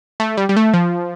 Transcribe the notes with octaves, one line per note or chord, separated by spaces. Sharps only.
A3
G3
G3
A3
F3